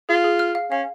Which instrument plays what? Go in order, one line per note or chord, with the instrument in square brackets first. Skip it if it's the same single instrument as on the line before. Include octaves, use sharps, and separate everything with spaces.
[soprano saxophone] F4 [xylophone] G#4
[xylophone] G#4
F6
F5
[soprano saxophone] C#4 [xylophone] F5